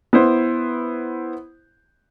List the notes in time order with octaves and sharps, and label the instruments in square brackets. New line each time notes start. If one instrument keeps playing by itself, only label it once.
[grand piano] B3 E4 C5